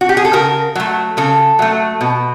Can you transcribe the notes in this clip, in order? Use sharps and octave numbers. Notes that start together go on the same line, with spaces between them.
F#4
G4
G#4
A4
C#3 A#4
F#3 A3
C#3 A4
F#3 A3
B2